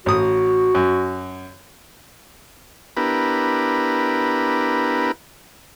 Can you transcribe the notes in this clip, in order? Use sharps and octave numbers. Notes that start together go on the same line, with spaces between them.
A1 F#4 D#6
F#2
B3 D4 E4 G4 A#4 B4